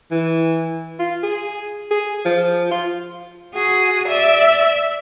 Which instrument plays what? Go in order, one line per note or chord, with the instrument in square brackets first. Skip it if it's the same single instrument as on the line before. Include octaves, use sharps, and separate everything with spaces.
[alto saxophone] E3
F4
G#4
G#4
F3
F4
[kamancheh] F#4 [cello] G#4
[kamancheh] D5 [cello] E5